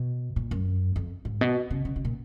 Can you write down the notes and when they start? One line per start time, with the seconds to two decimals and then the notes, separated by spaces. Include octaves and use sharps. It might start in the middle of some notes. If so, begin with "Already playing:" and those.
Already playing: B2
0.36 A#2
0.51 F#2
0.96 F2
1.25 G#2
1.41 B2
1.71 C#3
1.85 C#3
1.96 C#3
2.05 A#2